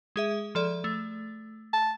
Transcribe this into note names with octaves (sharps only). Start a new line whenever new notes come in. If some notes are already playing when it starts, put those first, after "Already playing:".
G#3 G#4 E5
F3 A4 D5
A3
A5